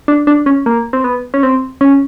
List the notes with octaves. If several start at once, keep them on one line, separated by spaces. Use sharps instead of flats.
D4
D4
C#4
A#3
C4
B3
C#4
C4
C#4